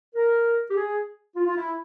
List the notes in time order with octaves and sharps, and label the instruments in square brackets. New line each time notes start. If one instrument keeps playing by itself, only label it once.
[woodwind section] A#4
G4
G#4
F4
F4
E4